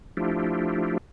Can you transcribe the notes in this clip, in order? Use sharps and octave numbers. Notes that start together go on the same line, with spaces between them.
F3 A3 D4 E4 F4 G4